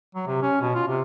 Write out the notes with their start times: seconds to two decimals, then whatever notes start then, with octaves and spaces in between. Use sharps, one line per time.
0.15 F#3
0.27 C3
0.42 C#4
0.62 B2
0.75 F4
0.88 C3